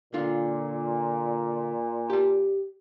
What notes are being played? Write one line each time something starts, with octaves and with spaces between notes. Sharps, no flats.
A#2 D3 F4
G4 A5